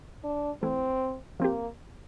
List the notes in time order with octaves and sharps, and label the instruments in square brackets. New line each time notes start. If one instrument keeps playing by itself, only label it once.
[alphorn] D4
[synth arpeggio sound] E3 A3 E4 [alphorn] C4
[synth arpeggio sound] F3 C4 G4 [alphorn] A#3